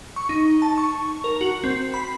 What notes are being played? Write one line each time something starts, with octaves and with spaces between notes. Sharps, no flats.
C#6
D#4
A5
C#6
A#4
F#4
C4
B5